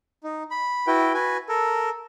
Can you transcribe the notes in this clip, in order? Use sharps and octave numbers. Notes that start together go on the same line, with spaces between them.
D#4
B5
E4 F#4 B4 G5
F#4 B4 G#5
A4 A#4